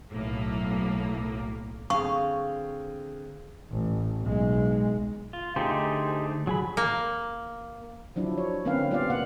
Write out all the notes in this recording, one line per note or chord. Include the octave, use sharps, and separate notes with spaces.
B1 A2 A#3
D3 C4 G#4 F5 C#6
A1
B1 G#3
F4
D3 A3 D#4 G4 G#4 C5
F#3 G#4 B5
A#3
F3 F#3 D4 E4
C#5
D3 A#3 C4 C#4 B4 F5
G3 B3 F4 D5 F5
B2 A#3 F#5